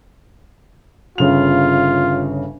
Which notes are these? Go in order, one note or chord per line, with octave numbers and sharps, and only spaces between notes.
G1 C#3 F4 F7